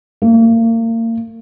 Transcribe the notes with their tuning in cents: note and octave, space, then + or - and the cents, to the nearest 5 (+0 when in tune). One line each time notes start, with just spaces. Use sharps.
A#3 -35